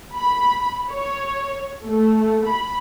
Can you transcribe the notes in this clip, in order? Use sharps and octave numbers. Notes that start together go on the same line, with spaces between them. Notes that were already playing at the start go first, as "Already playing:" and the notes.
B5
C#5
A3
B5